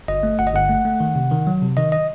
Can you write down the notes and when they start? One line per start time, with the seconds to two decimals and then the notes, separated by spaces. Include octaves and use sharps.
0.08 G1 D#5
0.23 A3
0.39 G1 F#5
0.47 D#5
0.54 G1 F#5
0.69 A3
0.85 A3
1.00 D#3
1.15 C3
1.31 D#3
1.47 F#3
1.62 C3
1.77 D#3 D#5
1.92 D#5